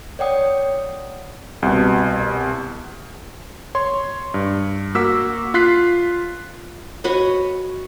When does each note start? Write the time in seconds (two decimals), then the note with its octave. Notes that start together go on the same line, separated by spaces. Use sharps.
0.19 C#5 D5 F#5 G5 D#6
1.62 C2 B2
3.75 C#5 C6
4.34 G2
4.95 A#3 F#4 D6 E6 B6
5.54 F4 F#6 B6 C7
7.04 F#4 B4 C#5 D#5